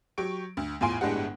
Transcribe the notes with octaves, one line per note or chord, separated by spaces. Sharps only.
F#3 G4 C#6 D7
D2
E2 A2 F4 G#5 C6 D7
G1 A2 G#3 D4 G4 F#5